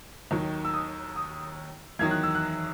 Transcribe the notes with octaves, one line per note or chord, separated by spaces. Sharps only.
D#2 D#3 F#3
E6
D#6
D#6
E2 D#3 F#3 G#6
F#6
E6
F#6